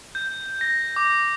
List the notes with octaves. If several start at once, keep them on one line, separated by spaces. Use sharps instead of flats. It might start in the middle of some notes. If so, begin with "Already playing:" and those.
G6
A#6
D6